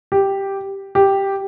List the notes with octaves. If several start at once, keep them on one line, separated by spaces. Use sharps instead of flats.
G4
G4